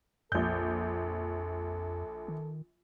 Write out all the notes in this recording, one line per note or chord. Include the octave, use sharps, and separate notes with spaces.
A#1 F2 A4 G6
D#3